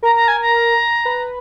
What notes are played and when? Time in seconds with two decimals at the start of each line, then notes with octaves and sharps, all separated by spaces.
0.03 A#4 A#5
0.16 A#5
0.28 G#5
0.42 A#5
1.05 B4